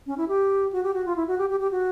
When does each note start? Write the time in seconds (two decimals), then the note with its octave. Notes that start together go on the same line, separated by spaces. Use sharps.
0.07 C#4
0.17 E4
0.28 G4
0.73 F#4
0.83 G4
0.94 F#4
1.06 F4
1.16 E4
1.28 F#4
1.38 G4
1.50 G4
1.60 G4
1.71 F#4